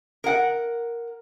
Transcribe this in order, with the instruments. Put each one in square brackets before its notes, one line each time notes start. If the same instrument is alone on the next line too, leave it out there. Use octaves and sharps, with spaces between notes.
[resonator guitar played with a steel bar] A#4 F#5